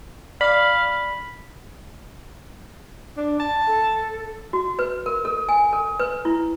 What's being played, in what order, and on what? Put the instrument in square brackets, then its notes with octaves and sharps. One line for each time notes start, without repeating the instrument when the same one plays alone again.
[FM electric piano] D5 [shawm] F5 [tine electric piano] B5
[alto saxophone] D4
A5
[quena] A4
[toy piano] F#4
B4
A#4
A4
G#5
A4
B4
E4